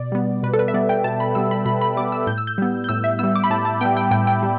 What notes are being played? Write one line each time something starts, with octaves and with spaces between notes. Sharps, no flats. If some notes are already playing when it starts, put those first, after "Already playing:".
Already playing: B2 D5
G3 B3
B2 B4
A4
B4
E5
G3 B3 D5
G5
B2 A5
B5
G3 B3 E6
B5
B2 B5
B5
G3 B3 D6
E6
A2 G6
E6
G6
G3 B3
G6
A2 E6
E5
G3 B3 E6
D6
B5
A2 A5
A5
G3 B3 G5
G5
A2 G5
G5
G3